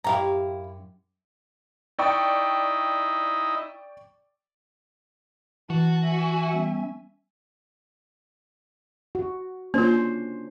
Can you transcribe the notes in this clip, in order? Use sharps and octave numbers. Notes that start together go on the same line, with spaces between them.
F#2 E4 G4 F5 A#5
D#4 E4 D5 G5 C#6
E3 F#4 A5
E5 G#5
G3 B3 C#4
F#4
A#3 C#4 D4 F4 C5